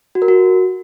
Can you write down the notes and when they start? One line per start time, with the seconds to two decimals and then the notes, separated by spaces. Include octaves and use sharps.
0.15 F#4
0.22 A#4
0.28 F#4